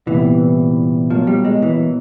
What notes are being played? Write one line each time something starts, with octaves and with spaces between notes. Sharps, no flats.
C2 A#2 E3 G3 B3 E4
B2 F3 F#3 A#3
G3
G#3
E3